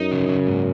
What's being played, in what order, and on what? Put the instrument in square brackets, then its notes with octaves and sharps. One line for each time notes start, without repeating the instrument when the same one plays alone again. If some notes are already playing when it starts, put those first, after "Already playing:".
Already playing: [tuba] F#2 [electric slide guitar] D#4
[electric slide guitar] C#3
C#3
G#2